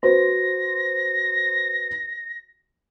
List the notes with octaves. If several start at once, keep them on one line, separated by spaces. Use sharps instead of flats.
F#4 B4 C5 A#6